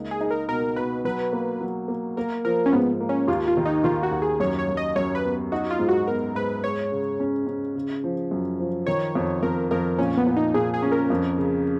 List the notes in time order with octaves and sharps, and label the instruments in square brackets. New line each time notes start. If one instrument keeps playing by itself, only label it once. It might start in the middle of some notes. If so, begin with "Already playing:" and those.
Already playing: [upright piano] C#2 A#3 D#4
[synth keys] G#4
[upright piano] D#4
[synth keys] A#4
[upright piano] B2 [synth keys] A#4
[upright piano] B2 [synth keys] B4
[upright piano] F#3 [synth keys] B4
[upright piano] A#3
F#3
A#3
[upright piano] A#3 [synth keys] A#4
[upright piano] F3 [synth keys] A#4
[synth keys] C#4
[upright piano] G#2 [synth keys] B3
[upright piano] A#3
[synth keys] C#4
[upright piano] D#2 [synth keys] F4
[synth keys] F4
[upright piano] D#3
[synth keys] D#4
[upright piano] D#3 [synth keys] F4
[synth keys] F#4
[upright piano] D#2
[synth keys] G#4
[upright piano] F#2 [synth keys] C#5
[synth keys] C#5
[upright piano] F#2
[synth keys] D#5
[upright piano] F#2 [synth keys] C#5
[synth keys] B4
[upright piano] B3
[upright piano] D#4 [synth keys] F#4
[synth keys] F4
[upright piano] G#2
[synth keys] F#4
[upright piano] B3 [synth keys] A#4
[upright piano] G#2 [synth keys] B4
[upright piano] G#3 [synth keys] C#5
[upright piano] C#3
C#4
C#4
C#3
F3
F#2
F3
[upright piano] D#3 [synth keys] C#5
[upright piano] F2
[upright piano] F2 [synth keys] A#4
[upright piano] F2 [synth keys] A#4
[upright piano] A#2 [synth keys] C#4
[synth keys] B3
[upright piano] A#2
[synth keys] D#4
[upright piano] A#2 [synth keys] G#4
[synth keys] G#4
[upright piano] C#4
[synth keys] A#4
[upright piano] F2
C#3